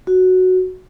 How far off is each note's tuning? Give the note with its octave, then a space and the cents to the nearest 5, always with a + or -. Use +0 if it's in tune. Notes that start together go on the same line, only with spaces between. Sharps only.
F#4 +0